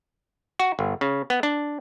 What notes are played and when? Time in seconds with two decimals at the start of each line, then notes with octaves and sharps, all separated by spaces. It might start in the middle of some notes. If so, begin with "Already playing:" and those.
0.59 F#4
0.79 G1
1.01 C#3
1.30 B3
1.43 D4